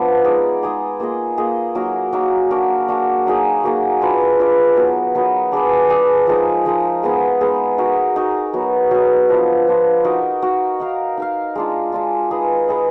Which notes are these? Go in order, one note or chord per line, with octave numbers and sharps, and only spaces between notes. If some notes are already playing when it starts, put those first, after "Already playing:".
Already playing: F3 B3 D4
G#3 D#4 G#4 D5
G#3 D#4 G#4 D5
A#3 F4 G#4 D#5
A#3 F4 G#4 D#5
F#3 A#3 D#4 A#4
F#3 A#3 D#4 A#4
D4 F#4 A#4
D4 F#4 A#4
F#3 A#3 D#4 G#4
F#3 A#3 D#4 G#4
D4 F4 B4 D5
D4 F4 B4 D5
F#3 B3 D#4 A#4
F#3 B3 D#4 A#4
D4 G#4 B4 D5
D4 G#4 B4 D5
F3 G#3 D#4 A#4
F3 G#3 D#4 A#4
G#3 B3 D#4 G#4
G#3 B3 D#4 G#4
D#4 F#4 A#4
D#4 F#4 A#4
F#3 B3 D#4
F#3 B3 D#4
F3 B3 D4 F4
F3 B3 D4 F4
D#4 F#4 A#4
D#4 F#4 A#4
D#4 A#4 F5
D#4 A#4 F5
G#3 D4 F4
G#3 D4 F4
D#4 G#4 B4
D#4 G#4 B4